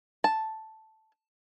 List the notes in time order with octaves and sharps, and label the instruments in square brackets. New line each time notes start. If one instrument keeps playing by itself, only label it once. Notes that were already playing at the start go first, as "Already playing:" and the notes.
[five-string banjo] A5